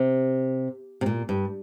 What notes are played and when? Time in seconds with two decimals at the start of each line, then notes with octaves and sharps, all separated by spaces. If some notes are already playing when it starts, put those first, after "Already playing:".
Already playing: C3
1.01 C3
1.06 A#2
1.29 G2